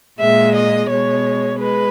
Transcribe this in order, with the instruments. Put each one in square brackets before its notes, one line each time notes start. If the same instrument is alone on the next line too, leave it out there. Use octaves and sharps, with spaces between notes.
[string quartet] A#2 G#3 E5
D#5
B2 G#3 C#5
G#3 B4